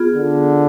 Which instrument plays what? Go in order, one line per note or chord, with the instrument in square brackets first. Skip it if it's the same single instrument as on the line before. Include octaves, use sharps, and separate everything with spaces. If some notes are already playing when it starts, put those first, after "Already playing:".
Already playing: [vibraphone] B3 F4 G#4
[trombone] D3